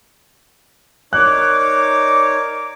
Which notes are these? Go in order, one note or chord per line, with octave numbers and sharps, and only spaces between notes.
D#4 A#4 C#5 D5 D6 F#6